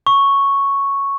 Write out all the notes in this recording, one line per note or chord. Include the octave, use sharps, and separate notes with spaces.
C#6